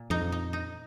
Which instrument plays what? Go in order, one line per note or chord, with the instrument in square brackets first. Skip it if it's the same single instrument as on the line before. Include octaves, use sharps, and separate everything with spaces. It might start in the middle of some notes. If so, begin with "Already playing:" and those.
Already playing: [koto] A#2
[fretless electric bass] F2 [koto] D#4
[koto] D#4
D#4